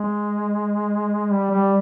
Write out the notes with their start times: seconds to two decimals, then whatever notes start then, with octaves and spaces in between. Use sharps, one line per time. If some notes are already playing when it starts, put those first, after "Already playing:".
Already playing: G#3
1.30 G3
1.51 G3